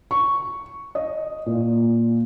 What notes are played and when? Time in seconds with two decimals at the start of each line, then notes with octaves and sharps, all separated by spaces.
0.11 C#6
0.95 D#5
1.46 A#2